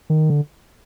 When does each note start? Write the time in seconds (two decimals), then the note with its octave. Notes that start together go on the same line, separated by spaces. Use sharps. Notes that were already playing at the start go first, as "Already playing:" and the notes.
0.10 D#3
0.30 D3